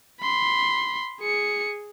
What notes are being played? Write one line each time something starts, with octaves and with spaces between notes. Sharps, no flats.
B5 C6
G#4 C#7